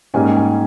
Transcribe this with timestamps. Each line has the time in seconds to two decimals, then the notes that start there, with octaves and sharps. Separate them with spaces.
0.14 G#2 G3 A#3 C#4 G#5
0.37 G#5